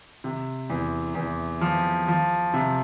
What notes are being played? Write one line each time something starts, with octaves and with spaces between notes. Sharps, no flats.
C3
E2
E2
F3
F3
C3